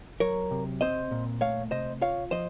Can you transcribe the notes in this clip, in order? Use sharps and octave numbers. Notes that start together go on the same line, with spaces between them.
F#3 A#4 C#5
C3
C4 C5 D#5
A#2
A3 C#5 F5
C3 C5 D#5
F4 C#5 F5
F3 C5 D#5